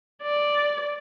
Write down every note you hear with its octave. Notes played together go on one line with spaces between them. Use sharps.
D5